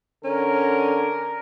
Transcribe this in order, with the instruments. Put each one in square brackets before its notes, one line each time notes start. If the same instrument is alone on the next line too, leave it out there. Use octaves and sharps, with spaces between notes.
[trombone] D3 [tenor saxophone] C#4 [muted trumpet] A#4